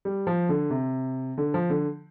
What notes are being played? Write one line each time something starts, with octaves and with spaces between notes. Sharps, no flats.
G3
F3
D3
C3
D3
F3
D3